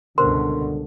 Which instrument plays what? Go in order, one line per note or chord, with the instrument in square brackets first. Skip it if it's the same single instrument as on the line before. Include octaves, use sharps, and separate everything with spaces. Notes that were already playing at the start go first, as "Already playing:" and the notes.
[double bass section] C#2 G2 B2 [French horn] D3 [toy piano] A#4 C5 [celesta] C6